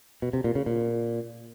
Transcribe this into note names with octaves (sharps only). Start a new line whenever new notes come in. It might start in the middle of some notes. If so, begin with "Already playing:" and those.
B2
C3
A#2
C#3
A#2